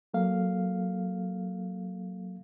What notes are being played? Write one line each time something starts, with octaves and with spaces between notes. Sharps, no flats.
F#3 A#3 A4 F5